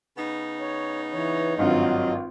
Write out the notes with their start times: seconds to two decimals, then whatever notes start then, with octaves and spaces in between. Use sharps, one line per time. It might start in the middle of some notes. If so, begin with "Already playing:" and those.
0.16 C#3 B3 D#4
0.61 C#5
1.13 E3 C#5
1.58 G#1 G2 F#3 C4 F4 D#5